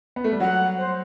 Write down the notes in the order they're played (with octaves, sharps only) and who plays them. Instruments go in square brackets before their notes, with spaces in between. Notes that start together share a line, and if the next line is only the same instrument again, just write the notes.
[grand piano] B3
A3
G3
[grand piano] F#3 [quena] F#5
[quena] C5